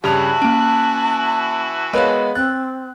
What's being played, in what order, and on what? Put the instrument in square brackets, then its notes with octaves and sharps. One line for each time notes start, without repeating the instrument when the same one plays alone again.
[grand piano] G2 C#3 F7 [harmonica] E3 E4 F#4 [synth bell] G4 [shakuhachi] A5
[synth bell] A#3 C#4 [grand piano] D7
[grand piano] G#3 B3 B4 [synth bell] A#4 C#5 F5
[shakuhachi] C4 [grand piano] F#6 [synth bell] A6